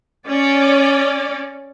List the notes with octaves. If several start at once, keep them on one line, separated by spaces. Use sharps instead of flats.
C#4 D5